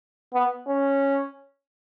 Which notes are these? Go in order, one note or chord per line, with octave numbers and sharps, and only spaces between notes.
B3
C#4